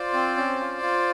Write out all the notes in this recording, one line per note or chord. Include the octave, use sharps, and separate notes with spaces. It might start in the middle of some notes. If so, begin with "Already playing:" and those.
Already playing: F4 C5 D5
C4
C#4
F4
F4